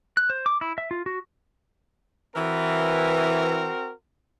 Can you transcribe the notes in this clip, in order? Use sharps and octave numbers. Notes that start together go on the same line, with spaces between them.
F#6
C5
D6
E4
E5
F4
F#4
E3 C4 F#4 A#4